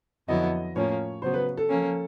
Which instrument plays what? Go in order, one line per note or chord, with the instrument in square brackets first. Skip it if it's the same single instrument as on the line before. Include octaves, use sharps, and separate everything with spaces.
[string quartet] F2 D3 F#3 B3 E4 [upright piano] D#5
[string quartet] A2 F3 A#3 C#4 [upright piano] C#5
[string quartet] C#3 F#3 B3 [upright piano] C5
[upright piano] B4
A4
[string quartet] F3 A#3 C#4